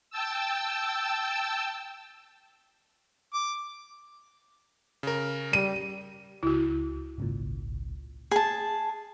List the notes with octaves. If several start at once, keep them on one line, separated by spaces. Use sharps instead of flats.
G5 A5 E6
D6
C#3 A#4
G3 D#7
C#2 E4 F#4
G#1 C#2 A#2
G#4 A5